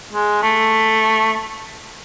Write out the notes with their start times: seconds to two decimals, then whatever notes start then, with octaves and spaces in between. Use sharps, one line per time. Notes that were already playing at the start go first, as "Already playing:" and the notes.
0.13 G#3
0.42 A3